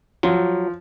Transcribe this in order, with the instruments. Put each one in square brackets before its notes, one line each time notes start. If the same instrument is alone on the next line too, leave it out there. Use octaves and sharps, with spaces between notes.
[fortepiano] F3 [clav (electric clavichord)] F#3